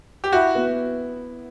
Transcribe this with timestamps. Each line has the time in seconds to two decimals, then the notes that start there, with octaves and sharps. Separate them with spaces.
0.24 G4
0.33 E4 F#4
0.55 B3